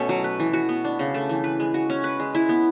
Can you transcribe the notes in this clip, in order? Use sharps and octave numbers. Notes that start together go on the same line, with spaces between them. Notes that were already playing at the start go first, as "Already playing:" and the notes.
Already playing: B2 A3 C#4
F#3
B4
E3
F#4
B3
D4
C#3
A3
E3
B4
G#3
F#4
C#4
B4
G#3
E4
B3